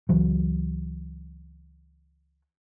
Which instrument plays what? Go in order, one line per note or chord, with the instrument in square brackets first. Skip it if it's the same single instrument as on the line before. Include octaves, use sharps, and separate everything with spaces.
[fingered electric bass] C#2 E3 F#3